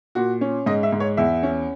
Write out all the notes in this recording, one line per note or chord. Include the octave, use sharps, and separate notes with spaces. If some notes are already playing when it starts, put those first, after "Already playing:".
A#2 F#4
C#4
G#2 D#5
E5
G#2
C#5
E2 E5
C#4